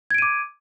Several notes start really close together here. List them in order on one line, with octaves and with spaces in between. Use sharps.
G#6 D7 D#7 D6